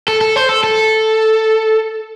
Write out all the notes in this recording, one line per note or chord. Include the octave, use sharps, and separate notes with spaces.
A4
A4
C5
A4
A4